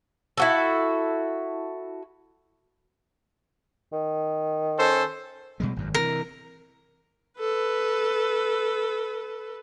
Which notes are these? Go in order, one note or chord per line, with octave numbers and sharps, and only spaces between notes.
E4 F#4 A4
D#3
C#4 A4 C5
B2 G3 G#3
G#1 F#2
C3 E3 A#4
A4 B4